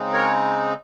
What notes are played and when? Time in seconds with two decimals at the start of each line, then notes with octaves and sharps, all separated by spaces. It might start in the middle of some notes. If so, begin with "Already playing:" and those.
Already playing: C#3 G#3 C4 D#4
0.13 A#4 C#5